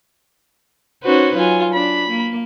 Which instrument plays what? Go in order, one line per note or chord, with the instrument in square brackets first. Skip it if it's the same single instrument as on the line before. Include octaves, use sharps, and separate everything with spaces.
[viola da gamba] C#4 D#4 B4 [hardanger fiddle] F#4 C5
[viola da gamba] F#3 [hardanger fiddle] F4 G#5
[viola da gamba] D4 [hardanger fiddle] B5
[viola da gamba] A#3